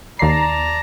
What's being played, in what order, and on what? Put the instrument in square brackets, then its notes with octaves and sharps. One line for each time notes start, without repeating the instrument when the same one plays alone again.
[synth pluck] D#2 C7 [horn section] D5 A5 A#5